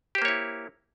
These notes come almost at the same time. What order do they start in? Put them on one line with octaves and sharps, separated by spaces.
G4 C5 A#3 C#5 E4